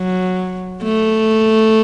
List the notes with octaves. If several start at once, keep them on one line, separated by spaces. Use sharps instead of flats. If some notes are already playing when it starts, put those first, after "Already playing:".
Already playing: F#3
A3